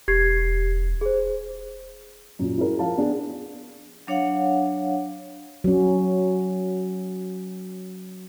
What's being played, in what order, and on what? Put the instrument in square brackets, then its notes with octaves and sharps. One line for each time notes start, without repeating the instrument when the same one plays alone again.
[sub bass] E1 [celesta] G4 G#6 C7
[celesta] G#4 C5
[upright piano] F#2 A#2
E4 F#4 G#4 A#4
F3 F5 A5
B3 D4 G#4
[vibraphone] F#3 D4 C#5 F5 F#5
[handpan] F#3 C#4